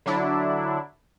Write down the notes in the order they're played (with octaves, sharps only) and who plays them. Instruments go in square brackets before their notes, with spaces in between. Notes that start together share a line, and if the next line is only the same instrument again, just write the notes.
[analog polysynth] D3 F#3 D4 E4